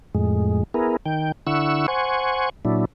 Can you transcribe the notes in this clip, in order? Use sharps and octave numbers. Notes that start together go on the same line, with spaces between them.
F2 A2 G#3
B3 E4 G#4 A#4
D#3 G5
D3 E4 F#5 C#6 E6
C5 F#5 G#5 C#6
A#2 F#3 D4 E4